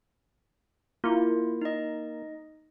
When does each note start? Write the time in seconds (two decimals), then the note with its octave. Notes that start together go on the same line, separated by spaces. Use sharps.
1.04 A#3 E4 F4
1.61 D#4 D#5